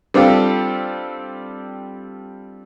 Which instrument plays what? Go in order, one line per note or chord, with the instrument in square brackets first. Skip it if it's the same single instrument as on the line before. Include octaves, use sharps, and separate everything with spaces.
[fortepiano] G3 C4 D4 F4 G4 A4